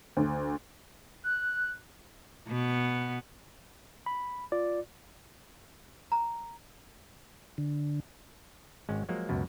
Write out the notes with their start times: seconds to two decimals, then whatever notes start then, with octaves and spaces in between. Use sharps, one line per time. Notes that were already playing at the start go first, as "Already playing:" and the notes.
0.17 D2
1.24 F#6
2.48 B2 B3
4.06 B5
4.52 F4 D5
6.12 A#5
7.58 D3
8.89 G#1 G#3 C#4
9.09 F3 F#3 G#3 A#3
9.29 C#2 F#2 B2